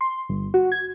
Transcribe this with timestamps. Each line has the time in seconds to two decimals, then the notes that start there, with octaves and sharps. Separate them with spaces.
0.01 C6
0.29 G1
0.54 F#4
0.72 G#6